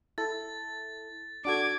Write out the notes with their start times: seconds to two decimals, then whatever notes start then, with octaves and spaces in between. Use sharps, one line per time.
0.18 E4 A4 A6
1.45 D4 F#4 A4 D6 G#6